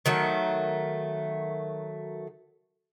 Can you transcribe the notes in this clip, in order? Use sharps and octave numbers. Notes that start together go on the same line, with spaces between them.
D#3 F#3 A3